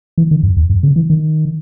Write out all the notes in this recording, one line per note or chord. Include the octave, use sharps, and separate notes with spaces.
E3
D#3
F#2
E2
F#2
C#3
E3
D#3